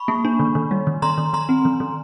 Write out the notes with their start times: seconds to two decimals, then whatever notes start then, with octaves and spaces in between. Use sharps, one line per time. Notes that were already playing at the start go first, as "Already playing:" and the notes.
Already playing: B5 C#6
0.08 A#3
0.25 D4
0.40 D#3
0.55 D#3
0.71 G3
0.87 D#3
1.02 D#3 A#5 C6
1.18 D#3
1.33 D#3 A#5 C6
1.49 C4
1.65 D#3
1.80 D#3